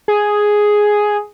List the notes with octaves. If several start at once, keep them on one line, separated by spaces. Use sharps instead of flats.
G#4